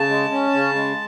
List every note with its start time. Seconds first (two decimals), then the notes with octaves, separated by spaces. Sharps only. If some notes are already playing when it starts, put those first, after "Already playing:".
Already playing: C#3 A5
0.09 G#3
0.31 C#4
0.54 C#3
0.75 G#3